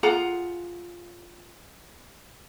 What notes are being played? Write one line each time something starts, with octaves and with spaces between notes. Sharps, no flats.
F4 G#4 F#5 A#5